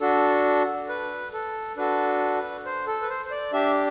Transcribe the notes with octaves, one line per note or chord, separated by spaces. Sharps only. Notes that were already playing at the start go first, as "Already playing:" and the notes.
D4 F#4 A4
B4
A4
D4 F#4 A4 B4
C5
A4
B4
C5
C5
D5
D4 G4 E5